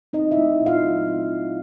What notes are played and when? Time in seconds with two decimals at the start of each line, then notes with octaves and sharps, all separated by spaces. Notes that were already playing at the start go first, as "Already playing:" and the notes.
0.13 C4 D#4 D#5
0.31 E4 E5
0.37 A3
0.61 A#2
0.66 F4 F5
0.85 F#3
1.08 C4
1.32 A3